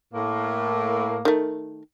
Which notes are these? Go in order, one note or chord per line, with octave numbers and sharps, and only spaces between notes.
A2 A#3
D#3 A3